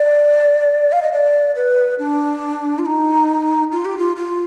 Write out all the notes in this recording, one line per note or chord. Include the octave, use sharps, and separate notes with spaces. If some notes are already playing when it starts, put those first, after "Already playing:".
Already playing: D5
F5
D#5
D5
B4
D4
F4
D#4
F4
G4
F4
F4